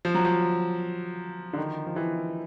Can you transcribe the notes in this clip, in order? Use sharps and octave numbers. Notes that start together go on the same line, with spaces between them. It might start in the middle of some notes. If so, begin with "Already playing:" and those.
F3
F#3
F3
D3
D#3
F3
E3